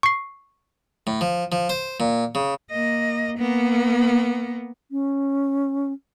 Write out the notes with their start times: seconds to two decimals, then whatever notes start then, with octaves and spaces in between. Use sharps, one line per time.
0.03 C#6 C7
1.07 A2
1.21 F3
1.52 F3
1.69 C5
2.00 A#2
2.35 C#3
2.71 A#3 D#5
3.38 A#3 B3
4.91 C#4